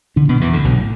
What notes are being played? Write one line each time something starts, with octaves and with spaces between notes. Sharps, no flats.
D3 D4
B2 B3
E2 E3
D2 D3
B1 B2
A2